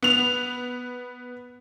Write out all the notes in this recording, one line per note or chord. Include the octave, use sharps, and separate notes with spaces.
B3 F7